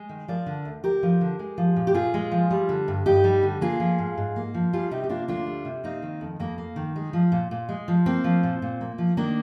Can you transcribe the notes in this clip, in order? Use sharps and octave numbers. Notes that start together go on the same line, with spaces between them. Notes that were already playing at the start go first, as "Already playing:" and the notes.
Already playing: G#3
D#3
F3 A#4 D5
D3
D2
D2 G4 A#4
F3
D3
G#3
F3
A#2
G4
A#2 F4 G#4
G#3
F3
G3
D3
G2
G2 D#4 G4
G3
D3
A#3 F4 G#4
F3
G#2
G#2
A#3
F3
G3 F4 G#4
C3 D#4 G4
G4
A#3 D4 F4
D2 D4 F4
G3
C3
A#3 C4 D#4
D#3
F2
F2 A#3
A#3
D#3
G#3
F3
A#2
A#2
G#3
F3
A#3 C4
F3
A#2
A#2
A#3
F3
D#3 A#3 D4